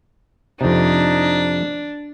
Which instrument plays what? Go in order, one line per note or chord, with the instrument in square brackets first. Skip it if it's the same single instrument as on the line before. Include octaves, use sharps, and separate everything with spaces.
[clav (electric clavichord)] F2 C3 [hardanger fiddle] D4 [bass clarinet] D#4